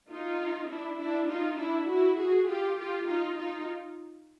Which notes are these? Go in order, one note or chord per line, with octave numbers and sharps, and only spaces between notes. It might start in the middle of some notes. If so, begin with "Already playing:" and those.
D#4 F4
D4 E4
D4 E4
D#4 F4
D4 E4
E4 F#4
F#4 G#4
F4 G4
F4 G4
D#4 F4
D#4 F4